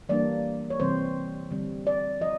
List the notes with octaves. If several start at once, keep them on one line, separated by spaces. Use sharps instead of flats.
E3 G3 A#3 D4 D5
C#5
C3 E3 G3 C4 C5
D3 G3 C4
D5
F3 D#5